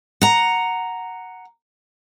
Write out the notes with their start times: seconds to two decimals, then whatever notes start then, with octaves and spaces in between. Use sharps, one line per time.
0.22 F#5 A#5